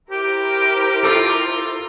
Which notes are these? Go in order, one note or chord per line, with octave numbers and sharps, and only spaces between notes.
E4 G4 A#4 C5
F4 A4 D6